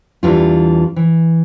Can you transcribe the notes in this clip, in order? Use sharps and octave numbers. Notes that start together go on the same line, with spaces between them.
E2 E3 G3 D4 F4
E3